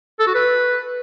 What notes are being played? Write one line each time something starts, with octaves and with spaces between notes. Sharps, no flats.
A4
F#4
B4